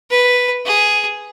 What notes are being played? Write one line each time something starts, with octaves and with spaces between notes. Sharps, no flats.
B4
G#4